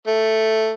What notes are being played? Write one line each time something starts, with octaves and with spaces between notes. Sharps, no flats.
A3